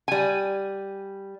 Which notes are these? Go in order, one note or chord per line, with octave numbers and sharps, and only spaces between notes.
G3 G#5